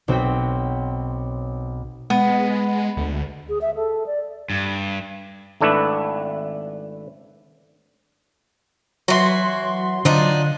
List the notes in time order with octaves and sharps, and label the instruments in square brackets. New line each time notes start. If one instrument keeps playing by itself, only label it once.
[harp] B1 C4 F#4 G5 B6
[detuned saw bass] G#3 [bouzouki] B3
[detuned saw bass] D2
[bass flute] G#4
E5
A4
D5
[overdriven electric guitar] G2
[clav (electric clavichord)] G#1 A3 D4 E4 B4
[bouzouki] E3 F#4 [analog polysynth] F#3 C6
[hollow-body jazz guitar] D3 [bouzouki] F3 D4 D#4